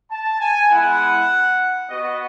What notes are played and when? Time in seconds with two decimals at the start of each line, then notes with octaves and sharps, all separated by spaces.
0.10 A5
0.40 G#5
0.70 G#3 B3 E4 F#5
1.89 B3 F#4 D#5